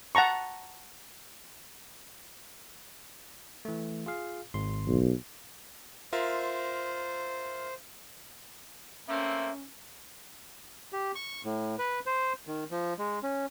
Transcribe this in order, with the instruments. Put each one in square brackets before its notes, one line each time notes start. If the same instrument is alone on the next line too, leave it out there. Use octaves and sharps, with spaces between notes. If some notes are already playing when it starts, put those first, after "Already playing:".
[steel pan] F#5 A5 A#5 C#6
[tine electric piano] E3 A3
F4 G#4 F5
G#1 C6
[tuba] B1
[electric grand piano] F4 A#4 E5 [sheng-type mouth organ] C5
[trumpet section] A3 A#3 C4 [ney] C#4 [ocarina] E5
[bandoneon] G4
C#6
A2
B4
C5
D#3
F3
G#3
C#4